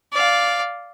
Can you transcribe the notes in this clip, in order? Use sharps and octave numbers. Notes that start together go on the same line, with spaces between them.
D5 F5